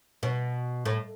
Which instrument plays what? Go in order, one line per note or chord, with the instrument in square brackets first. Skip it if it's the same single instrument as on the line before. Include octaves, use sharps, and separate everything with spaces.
[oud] B2
A2